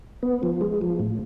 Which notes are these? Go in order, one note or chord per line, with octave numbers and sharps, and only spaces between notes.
B3
F3
G#3
F3
A2